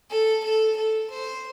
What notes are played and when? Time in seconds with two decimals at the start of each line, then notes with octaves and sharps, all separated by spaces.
0.10 A4
0.44 A4
0.77 A4
1.10 C5